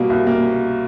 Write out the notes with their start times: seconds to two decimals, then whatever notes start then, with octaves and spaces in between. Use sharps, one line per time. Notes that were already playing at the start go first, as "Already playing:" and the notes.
Already playing: B2 G3 A#3
0.10 C2
0.27 A#3